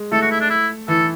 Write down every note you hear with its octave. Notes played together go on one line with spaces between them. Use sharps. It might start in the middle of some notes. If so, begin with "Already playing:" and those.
Already playing: G#3
A3 A4
F#4
E4
D4
E4
E3 A4